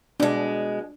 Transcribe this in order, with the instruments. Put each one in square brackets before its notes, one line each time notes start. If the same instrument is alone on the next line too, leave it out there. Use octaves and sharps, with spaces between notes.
[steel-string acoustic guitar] B2 G#3 [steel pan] D4